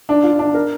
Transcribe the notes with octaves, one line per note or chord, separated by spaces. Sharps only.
D4
F4
D4
A#4